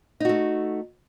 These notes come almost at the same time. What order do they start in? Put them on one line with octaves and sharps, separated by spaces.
D#4 F#4 A3